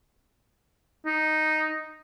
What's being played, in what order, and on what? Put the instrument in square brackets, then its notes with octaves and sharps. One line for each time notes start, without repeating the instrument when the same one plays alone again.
[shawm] D#4